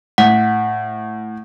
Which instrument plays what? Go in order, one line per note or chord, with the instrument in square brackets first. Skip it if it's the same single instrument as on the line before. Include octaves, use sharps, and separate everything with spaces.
[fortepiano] A2 [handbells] F#5